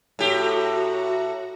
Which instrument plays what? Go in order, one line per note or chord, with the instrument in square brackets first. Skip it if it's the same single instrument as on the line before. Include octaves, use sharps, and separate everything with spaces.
[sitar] A2 G4 [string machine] F#4 A#5